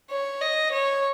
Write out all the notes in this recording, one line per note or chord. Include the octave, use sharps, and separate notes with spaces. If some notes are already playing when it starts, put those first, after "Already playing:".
C#5
D#5
C#5